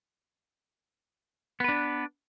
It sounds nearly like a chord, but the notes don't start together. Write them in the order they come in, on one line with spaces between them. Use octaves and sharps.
B3 B4 D4